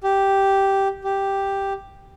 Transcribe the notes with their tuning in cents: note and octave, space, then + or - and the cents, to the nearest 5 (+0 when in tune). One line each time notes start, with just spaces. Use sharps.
G4 -5
G4 +0